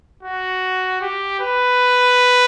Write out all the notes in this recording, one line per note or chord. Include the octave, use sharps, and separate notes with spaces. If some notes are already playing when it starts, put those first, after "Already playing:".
F#4
G4
B4